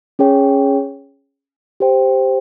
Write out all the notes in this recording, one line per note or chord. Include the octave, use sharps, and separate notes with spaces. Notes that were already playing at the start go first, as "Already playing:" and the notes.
C#4 G#4 C#5 G5
G4 C5 G5